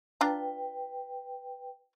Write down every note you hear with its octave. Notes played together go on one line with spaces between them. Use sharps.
D4 F4 B4 G5 A#5